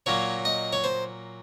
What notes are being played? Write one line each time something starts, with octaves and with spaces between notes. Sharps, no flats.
A#2 F#3 A#3 C#5
D#5
C#5
C5